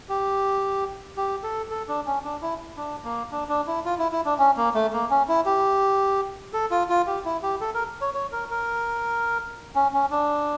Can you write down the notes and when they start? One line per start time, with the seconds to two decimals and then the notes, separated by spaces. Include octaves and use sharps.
0.09 G4
1.17 G4
1.43 A4
1.70 A4
1.88 D4
2.06 C#4
2.24 D4
2.42 E4
2.77 D4
3.04 A#3
3.31 D4
3.49 D4
3.67 E4
3.85 F4
3.99 E4
4.12 E4
4.25 D4
4.39 C#4
4.57 A#3
4.74 A3
4.93 A#3
5.10 C#4
5.28 E4
5.46 G4
6.53 A4
6.71 F4
6.89 F4
7.07 G4
7.25 E4
7.43 G4
7.61 A4
7.74 A#4
8.01 C#5
8.14 C#5
8.32 A#4
8.50 A#4
9.75 C#4
9.93 C#4
10.11 D4